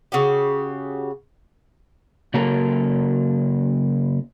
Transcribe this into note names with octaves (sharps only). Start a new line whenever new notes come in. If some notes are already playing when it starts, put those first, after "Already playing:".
C#3 F#4 G4
C#3 F#3 A#3 A4 A#4 A#5